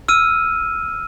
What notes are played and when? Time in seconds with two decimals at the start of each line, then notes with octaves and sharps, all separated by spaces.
0.08 E6 F6 D#7